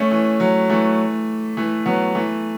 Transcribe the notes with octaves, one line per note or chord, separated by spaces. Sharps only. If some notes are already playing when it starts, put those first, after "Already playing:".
Already playing: A3 C#4
E3
F#3
E3 A3
E3 A3
F#3 B3
E3 A3